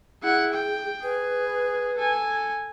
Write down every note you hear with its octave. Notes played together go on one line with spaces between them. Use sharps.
E4 G#4 F#5
G5
G#4 B4
A4 G#5